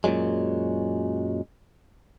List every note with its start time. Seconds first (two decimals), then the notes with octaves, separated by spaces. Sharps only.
0.04 F#2 A#2 C#3 F#3 G#3